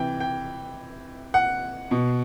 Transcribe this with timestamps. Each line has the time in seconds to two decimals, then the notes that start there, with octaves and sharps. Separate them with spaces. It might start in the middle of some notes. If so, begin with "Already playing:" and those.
Already playing: C3 E3 G5
0.20 G5
1.34 F#5
1.91 B2